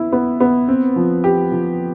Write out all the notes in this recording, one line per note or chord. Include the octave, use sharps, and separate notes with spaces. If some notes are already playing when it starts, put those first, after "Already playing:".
Already playing: B3 E4
B3
B3
C4
F3
G4
F3